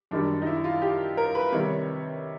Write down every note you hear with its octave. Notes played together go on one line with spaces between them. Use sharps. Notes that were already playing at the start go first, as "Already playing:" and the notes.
F#2 D#3 G3 D4
D#4
E4
F4
G4
A#4
B4
C3 D#3 G3 C#5